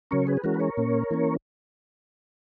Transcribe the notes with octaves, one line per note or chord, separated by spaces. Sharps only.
C#3 F#3 C#4 A#4 C#5
G#4 B4
B4
E3 G#3 C#4 F#4 A#4
B4
A#4 C#5
A#2 A#3 C#4
E3 A#3 C#4